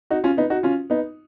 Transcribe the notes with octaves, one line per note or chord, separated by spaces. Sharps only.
D#4 F#4
C#4 F4
B3 D#4
D#4 F#4
C#4 F4
B3 D#4